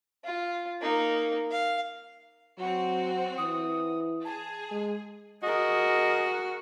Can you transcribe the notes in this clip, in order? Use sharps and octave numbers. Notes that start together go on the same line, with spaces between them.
F4
A#3 D#4
F5
F#3 C4 F#4
E3 D#6
G#4 A5
G#3
F#4 G#4 A#4 D#5